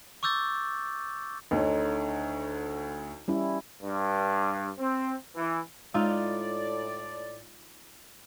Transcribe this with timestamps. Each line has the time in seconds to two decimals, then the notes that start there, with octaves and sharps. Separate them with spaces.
0.23 C#6 D6 E6 G6 A6
1.51 D2 D3 D#4 C#5
3.28 G3 C#4 E4
3.82 G2
4.79 C4
5.36 E3
5.94 A2 G#3 D#4 F4 D5